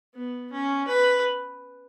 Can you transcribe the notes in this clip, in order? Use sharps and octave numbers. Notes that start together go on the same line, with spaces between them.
B3
C#4
B4